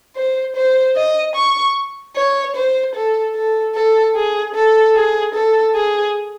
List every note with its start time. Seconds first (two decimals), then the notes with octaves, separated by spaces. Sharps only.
0.16 C5
0.56 C5
0.96 D#5
1.35 C#6
2.16 C#5
2.56 C5
2.95 A4
3.35 A4
3.75 A4
4.15 G#4
4.55 A4
4.95 G#4
5.34 A4
5.75 G#4